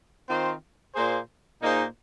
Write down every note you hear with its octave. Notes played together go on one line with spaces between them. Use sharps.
D#3 C4 F4 C5
A#2 A#3 G#4 C5
A#2 A#3 D#4 G#4 C5